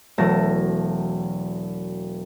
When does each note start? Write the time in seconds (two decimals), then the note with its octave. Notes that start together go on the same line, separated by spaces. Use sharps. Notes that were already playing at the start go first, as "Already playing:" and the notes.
0.18 E1 F#3 A3 A5 A#6